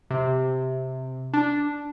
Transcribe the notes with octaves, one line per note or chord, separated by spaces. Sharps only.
C3
D4